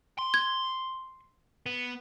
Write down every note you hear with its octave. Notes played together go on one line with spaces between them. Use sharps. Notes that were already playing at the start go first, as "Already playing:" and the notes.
C6
G#6
B3